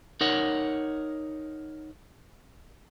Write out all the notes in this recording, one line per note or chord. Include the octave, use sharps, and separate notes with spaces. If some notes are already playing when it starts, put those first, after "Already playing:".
D#4 A#4 C#5 F#5